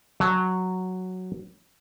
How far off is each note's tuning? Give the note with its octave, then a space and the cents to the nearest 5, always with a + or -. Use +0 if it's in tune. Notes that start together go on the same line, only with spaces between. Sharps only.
F#3 +0 A5 +0